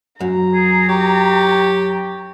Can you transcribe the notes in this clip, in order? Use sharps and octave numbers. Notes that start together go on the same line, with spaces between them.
F#2 A#5
G#4
G4 C#5